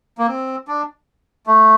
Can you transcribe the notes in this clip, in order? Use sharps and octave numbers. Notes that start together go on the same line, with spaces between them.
A#3
C4
D4
A3